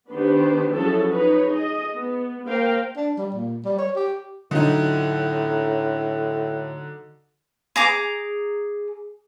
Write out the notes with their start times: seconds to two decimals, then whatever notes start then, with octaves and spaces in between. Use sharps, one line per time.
0.10 D#3 B3 D4 G4 B4 C5
0.72 F3 F#3 C#4 E4 G#4 A4
1.11 D#4 B4 C#5
1.50 G#4 D#5
1.93 B3
2.48 A#3 A#4 C5 F5 G5
2.96 D4
3.18 G3
3.34 A#2
3.65 G3
3.78 C#5
3.96 G4
4.51 A2 D3 F#3 D#4
7.76 G#4 A#5 D6